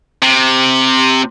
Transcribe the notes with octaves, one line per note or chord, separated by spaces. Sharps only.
C3